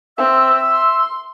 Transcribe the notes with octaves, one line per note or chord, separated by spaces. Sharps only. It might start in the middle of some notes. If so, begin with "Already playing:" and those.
C4 E5 E6
C6